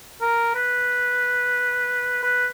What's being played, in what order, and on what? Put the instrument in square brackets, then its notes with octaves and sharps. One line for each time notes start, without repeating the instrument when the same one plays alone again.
[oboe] A#4
B4
B4